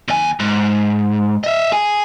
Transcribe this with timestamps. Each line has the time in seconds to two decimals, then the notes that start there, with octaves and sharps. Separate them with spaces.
0.08 D#2 G#5
0.40 G#2
1.44 D#5 E5
1.72 G#4 G#5